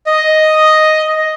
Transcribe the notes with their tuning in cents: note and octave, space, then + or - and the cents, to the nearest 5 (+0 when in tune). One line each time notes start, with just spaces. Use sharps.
D#5 +0